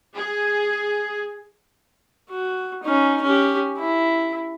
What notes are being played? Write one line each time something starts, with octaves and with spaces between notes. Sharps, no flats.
G#4
F#4
C#4 D#4
C#4 G4
E4